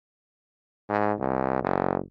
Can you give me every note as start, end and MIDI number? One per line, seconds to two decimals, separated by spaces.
0.90 1.13 44
1.19 1.59 36
1.62 1.97 30